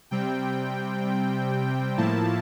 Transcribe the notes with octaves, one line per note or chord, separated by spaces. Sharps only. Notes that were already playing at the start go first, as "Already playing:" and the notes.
C3 G3 C4 G5
A2 F3 A#3 E4 A5